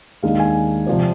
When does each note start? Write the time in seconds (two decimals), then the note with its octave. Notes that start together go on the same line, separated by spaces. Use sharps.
0.23 D#2 D#3 G#3 D4 F5
0.40 G#5
0.87 C3 F3 C4 D5